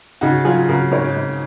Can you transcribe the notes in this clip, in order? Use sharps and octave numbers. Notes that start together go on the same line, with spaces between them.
C#3 D#4 F#4
F#3 F4 G#4
C#3 F#4 A#4
G#2 A#4 C#5
G#2